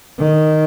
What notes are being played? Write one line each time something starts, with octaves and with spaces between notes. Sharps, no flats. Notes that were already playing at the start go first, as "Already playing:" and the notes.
D#3